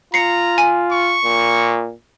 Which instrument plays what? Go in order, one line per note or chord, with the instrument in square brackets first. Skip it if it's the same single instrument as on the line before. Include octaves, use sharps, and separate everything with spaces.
[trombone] F4 [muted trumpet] A#5 [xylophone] C7 C#7
[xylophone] G#5
[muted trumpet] C#6
[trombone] A#2